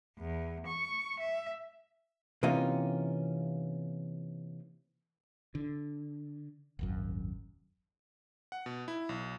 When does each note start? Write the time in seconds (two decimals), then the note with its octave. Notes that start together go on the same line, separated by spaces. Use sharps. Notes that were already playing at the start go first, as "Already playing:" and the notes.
0.20 E2
0.67 C#6
1.21 E5
2.43 C3 E3 A#3 C#4 D#4 F4
5.55 D3
6.79 D#1 G#1 F#2
8.52 F#5
8.66 B2
8.88 E4
9.09 B1